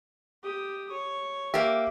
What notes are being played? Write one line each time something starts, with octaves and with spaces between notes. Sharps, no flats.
G4 D#6
C#5
A#3 G4 E5